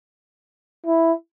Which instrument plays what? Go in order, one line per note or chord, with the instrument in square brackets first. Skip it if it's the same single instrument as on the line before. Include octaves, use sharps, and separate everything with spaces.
[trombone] E4